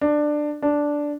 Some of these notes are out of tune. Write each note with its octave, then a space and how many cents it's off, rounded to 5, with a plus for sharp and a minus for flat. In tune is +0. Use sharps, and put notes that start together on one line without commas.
D4 +15
D4 -5